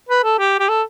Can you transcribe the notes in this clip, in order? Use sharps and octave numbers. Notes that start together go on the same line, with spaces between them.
B4
A4
G4
G4
A4